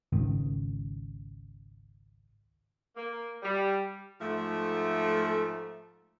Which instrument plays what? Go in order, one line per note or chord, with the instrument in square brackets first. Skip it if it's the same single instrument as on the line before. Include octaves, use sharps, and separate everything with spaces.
[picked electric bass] G#1 C#2 D#3
[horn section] A#3
G3
[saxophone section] G#2 F3 A3